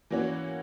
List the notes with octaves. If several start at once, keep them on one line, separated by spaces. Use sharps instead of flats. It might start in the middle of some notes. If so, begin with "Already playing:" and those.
E3 A#3 C#4 F#4 C#5